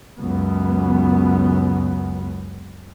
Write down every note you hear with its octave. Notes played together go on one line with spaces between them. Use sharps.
C#2 F#2 B3